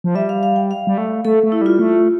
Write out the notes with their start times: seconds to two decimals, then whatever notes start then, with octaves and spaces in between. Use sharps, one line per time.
0.04 F3
0.15 G3 E5
0.29 F5
0.43 F5
0.56 G5
0.71 F5
0.87 G3
0.98 A3
1.25 A3 A4
1.43 A3
1.52 E4
1.61 G3 F4
1.79 A3